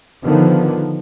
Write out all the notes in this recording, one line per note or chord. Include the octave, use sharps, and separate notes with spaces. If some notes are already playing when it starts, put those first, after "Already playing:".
D3 D#3 F3 B3